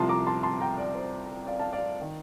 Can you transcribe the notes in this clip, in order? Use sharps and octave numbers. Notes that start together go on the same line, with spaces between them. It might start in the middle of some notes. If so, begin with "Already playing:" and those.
Already playing: C2 C3 F3 A5 C6
A#5 D6
A5 C6
A5 C6
G5 A#5
D5
C5
D5 F5
F5 A5
D5 F5
D#3